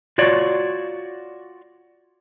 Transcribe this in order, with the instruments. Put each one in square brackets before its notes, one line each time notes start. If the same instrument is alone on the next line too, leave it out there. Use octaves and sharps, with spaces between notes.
[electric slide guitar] F4 F#4 C#5 D5